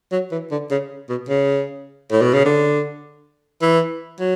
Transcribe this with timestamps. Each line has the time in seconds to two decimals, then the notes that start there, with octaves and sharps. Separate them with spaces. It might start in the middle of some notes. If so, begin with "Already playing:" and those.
0.12 F#3
0.32 E3
0.51 D3
0.71 C#3
1.09 B2
1.29 C#3
2.11 A2
2.22 B2
2.34 C#3
2.45 D3
3.62 E3
4.20 F#3